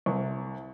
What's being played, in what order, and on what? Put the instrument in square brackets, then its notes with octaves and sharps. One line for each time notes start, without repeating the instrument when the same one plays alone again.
[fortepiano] C2